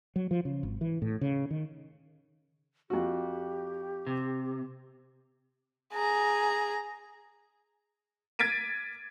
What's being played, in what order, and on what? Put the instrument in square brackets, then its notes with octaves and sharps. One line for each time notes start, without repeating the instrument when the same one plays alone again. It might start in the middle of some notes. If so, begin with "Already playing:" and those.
[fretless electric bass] F#3
F3
C#3
G#1
E3
A2
C#3
D#3
[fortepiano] F2 F#4 [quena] G4
[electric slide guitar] C3
[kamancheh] G#4 A#5
[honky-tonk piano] G#6 A6 B6 D7 D#7